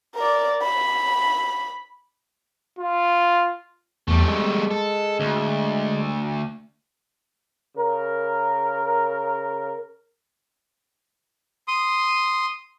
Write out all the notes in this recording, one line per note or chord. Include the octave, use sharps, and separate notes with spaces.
A#4 D5
B5
F4
E2 G3 A3
G#3
A4
D2
C#3 A#4
C6 D#6